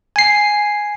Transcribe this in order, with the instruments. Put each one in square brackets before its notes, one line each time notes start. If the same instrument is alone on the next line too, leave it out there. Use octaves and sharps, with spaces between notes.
[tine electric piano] G#5 C7